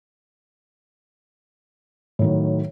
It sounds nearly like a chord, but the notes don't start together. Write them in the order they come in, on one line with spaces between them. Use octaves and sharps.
A2 D#3 F#3